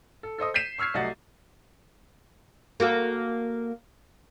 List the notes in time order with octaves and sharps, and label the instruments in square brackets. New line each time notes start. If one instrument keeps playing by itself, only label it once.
[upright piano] A4
A4 C5 D#5 D#6
G6 B6 C7 D#7 E7
C#6 E6 F6 G#6 C7
C2 F#3 A3 D#5 F#5 A6
[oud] A#3 F#4 A4